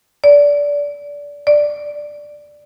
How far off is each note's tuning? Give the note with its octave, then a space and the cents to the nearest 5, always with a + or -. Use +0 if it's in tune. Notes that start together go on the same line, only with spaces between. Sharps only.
D5 -20
D5 +5